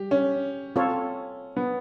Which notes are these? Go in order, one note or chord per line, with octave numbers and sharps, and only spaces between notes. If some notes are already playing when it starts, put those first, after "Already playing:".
Already playing: G3 G4
C#4
C4 F4 A4 C#5
B3